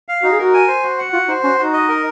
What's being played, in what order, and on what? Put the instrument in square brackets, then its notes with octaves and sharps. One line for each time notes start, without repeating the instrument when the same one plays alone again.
[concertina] F5
[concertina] D#4 [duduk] F#4
[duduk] G#4
[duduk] F#4 [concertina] A#4
[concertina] G#5
C5
F#4
F#5
[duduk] F4 [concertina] F#4
[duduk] D#4 [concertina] C5
[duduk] C#4 [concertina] F#4
[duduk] D#4 [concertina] F#4
[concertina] D#5
A#4